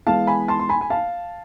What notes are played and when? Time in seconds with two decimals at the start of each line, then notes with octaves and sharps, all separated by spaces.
0.07 E3 G#3 B3 F5 A5
0.27 G#5 B5
0.48 A5 C6
0.59 C6
0.69 G#5 B5
0.81 G#5
0.90 F5 A5